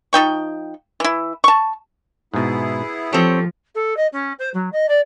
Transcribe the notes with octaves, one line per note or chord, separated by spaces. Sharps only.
F3 D#4 G5 C#6
E3 E4
A5 C#6
G#2 B2 B3 E4 G#4
F3 C4 G4 A4 C#5
A4
D#5
C#4
C5
F#3
D#5
D5